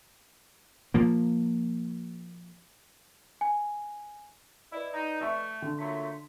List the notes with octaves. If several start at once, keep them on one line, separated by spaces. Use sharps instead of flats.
A#2 F3 A#3
G#5
E4 B4 D5 D#5
D#4
A3 E5 C#6
D3
A#2 F#3 A3 C6 B6